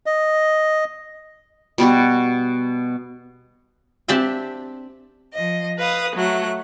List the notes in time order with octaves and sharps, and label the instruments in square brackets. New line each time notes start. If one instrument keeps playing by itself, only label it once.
[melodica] D#5
[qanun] B2 G3 B3 F#4
[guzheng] C4 D4 G4 D5 E5 G5
[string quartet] F3 D#5
B4 F5 D#6
F#3 A3 F#6